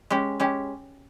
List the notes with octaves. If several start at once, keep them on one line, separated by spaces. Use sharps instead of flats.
G#3 C#4 G4
G#3 C#4 G4